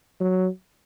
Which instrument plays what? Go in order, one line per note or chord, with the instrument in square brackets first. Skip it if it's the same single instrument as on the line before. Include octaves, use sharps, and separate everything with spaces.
[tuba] F#3